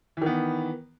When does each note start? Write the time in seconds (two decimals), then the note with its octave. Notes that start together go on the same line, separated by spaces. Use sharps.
0.17 E3
0.22 D#3
0.26 B3